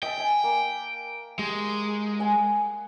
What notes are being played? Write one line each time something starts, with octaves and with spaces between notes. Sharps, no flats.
D#5 E5 G5 A5
E5 G#5
A#3
G#3 G4
F#5 G#5